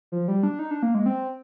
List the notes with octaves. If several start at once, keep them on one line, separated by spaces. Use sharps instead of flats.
F3
G3
D4
D#4
D4
A#3
G#3
C4